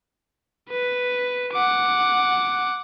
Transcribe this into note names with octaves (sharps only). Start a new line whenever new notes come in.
B4
F#5 D6